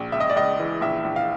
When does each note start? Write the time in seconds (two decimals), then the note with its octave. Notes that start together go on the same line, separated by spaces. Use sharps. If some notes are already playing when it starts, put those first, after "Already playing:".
Already playing: A#1
0.12 C#2 E5
0.20 D#5
0.30 D5
0.36 C#2 D#5
0.59 E3
0.81 A#1 E5
1.04 A#1
1.16 F5